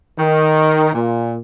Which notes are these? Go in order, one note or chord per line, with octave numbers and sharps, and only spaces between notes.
D#3
A#2